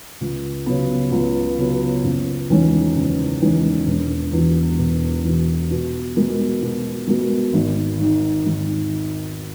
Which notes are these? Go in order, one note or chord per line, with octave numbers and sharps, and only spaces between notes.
C#2
C#3 F#3 B3
C#2
C#3 F#3 B3
F#1
E2 D#3 G#3 C#4
F#1
E2 D#3 G#3 C#4
E1
E2 B2
E1
E2 B2
B2
G#3 B3 F#4 A#4
B2
G#3 B3 F#4 A#4
G#1
G#2 D#3
G#1